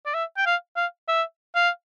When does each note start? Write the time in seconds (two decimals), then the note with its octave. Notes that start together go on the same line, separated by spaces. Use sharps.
0.06 D5
0.14 E5
0.37 G5
0.46 F5
0.76 F5
1.08 E5
1.55 F5